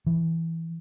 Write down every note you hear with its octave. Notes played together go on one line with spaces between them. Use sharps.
E3